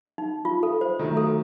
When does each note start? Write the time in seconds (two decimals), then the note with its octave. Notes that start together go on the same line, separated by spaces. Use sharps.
0.18 D#4
0.45 F4
0.63 A4
0.81 C5
0.99 D#3 F#3 A3
1.17 A4